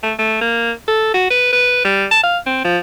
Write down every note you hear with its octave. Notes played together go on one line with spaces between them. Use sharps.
A3
A3
A#3
A4
F#4
B4
B4
G3
A5
F5
C4
F3